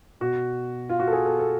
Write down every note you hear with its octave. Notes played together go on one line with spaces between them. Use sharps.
B2 F#4
F4
F#4
A4
G#4
A4
A4